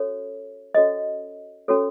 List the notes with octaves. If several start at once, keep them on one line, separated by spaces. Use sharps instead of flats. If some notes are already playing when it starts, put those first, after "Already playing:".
Already playing: C#4 F#4 A4 C#5
C#4 F#4 A4 C#5 D#5
C#4 F#4 A4 C#5